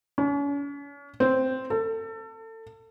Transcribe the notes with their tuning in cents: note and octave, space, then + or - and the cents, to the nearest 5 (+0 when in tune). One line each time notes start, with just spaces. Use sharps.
C#4 +40
C4 -5
A4 +30